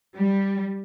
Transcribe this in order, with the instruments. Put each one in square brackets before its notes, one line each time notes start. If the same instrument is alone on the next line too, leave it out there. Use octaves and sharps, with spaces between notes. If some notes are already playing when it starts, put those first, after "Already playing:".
[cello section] G3